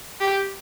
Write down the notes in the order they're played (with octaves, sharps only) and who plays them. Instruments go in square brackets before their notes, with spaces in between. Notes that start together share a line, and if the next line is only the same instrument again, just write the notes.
[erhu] G4